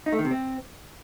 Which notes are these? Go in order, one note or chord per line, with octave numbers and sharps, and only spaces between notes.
D#4
A3
D#3
C3
C4